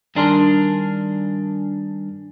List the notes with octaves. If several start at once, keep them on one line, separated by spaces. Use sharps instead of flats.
G2 D#3 D4 G#4 A#4 C6